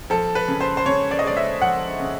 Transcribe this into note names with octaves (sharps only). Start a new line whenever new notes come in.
F3 A4
B4
C#3
C5
C5
C#3 C#5
D5
D#5
G#3 D5
E5
F3 F#5
C#3